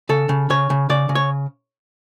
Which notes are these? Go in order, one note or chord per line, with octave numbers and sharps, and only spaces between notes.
C#3 A4
C#3
C#3 C#5
C#3
C#3 D5
C#3
C#5